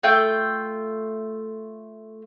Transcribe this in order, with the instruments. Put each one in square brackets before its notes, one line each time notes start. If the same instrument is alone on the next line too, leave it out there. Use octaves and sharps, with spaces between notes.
[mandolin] A3 F4 G5